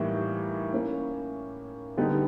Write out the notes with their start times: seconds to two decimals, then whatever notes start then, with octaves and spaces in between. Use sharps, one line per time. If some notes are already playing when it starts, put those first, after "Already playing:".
Already playing: A2 E3 G3 A#3 D#4
0.73 A#3 C#4 E4
1.97 D3 G3 B3 D#4